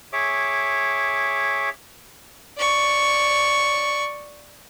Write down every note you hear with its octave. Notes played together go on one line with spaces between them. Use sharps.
G#4 C#5 E5 D6
D5 C#6